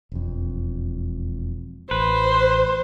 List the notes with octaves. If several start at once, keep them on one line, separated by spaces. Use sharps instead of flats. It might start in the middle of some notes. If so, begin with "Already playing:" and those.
E1 F2
A1 B4 C5